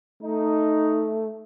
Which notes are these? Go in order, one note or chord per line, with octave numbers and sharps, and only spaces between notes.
A3 D#4